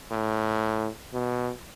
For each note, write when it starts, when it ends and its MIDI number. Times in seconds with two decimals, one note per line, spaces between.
0.11 0.88 45
1.13 1.51 47